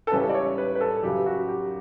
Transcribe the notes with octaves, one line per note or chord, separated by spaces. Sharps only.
A4
C#2 C#3 G3 C#4 E4 B4
D5
C#5
B4
B4
A4
F#2 C#3 F#3 G4
F#4
G4